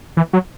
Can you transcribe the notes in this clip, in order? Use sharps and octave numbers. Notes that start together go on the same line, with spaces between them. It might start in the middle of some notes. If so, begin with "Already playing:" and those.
E3
F#3